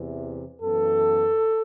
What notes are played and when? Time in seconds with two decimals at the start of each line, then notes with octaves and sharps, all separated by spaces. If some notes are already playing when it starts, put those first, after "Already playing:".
Already playing: E2 C3 E3
0.61 F#2 E3 B3 A4